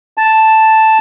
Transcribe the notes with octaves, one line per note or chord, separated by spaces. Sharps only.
A5